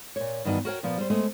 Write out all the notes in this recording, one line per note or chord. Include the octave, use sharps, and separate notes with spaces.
A#2 C#5
G2 D#3 E3 B3 D#4 F#4
F#4 A#4 C#5 G5
A#2 F3 B3
G3 C5
G#3 A3 B3 C5